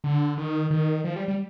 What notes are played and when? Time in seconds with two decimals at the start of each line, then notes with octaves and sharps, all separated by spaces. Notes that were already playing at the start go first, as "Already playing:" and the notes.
0.04 D3
0.38 D#3
0.71 D#3
1.04 F3
1.16 G3
1.28 G3